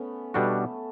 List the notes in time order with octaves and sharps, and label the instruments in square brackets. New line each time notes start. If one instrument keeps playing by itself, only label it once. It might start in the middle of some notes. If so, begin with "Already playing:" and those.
Already playing: [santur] A3 B3 C#4
[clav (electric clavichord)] B2 G3 D4 F#4 [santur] A3